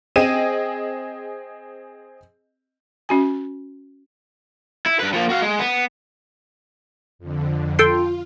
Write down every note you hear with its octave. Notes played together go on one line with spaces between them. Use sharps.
C4 G#4 D#5 D#7
C#4 F#4 G#5
E4
G2 B4
F3 A#3
F#4 F5
G#3
B3
F2 D3
F4 A4 G5 C6